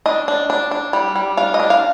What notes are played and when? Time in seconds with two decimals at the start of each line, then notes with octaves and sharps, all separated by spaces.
0.06 D4 D#5
0.28 D4
0.50 D4
0.71 D4
0.93 G3
1.16 G3
1.37 D4 F5
1.54 D#5
1.60 D4
1.70 F5